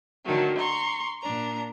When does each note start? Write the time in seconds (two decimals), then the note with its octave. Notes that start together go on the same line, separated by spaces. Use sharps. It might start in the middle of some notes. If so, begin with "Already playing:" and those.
0.23 D3 D#3 F#3 A3
0.56 A#5 C6 C#6
1.20 A#2 D4 A#5